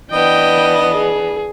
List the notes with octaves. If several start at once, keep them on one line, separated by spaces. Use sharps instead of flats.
E3 B3 D4 D#5 G5
G#4